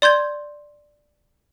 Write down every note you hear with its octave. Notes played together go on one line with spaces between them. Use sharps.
D5 C6 G6 G#6